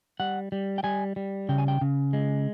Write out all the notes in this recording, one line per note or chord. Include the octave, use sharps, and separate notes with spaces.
G3 F#5
G3
G5
G3 G#5
G3
C#3 G5
G#5
G5
C#3
G#3